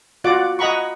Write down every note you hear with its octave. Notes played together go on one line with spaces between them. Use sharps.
F4 F#4 D5 F#5 D6
D#5 F#5 A#5 B5 C#6